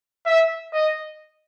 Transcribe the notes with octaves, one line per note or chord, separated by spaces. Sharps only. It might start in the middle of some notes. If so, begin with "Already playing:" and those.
E5
D#5